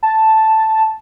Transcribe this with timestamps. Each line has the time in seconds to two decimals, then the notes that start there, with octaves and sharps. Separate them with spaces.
0.03 A5